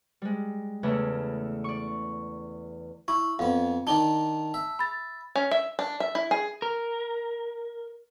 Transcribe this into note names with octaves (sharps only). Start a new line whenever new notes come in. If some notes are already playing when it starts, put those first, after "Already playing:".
G3 G#3
E2 C#3 E3 A3
D5 C#6
E4 C#6
F2 B3 F5
D#3 D4 D#4 A5 G7
E5
B5 A6
C#4
E5
D4
E5
E4
G#4
A#4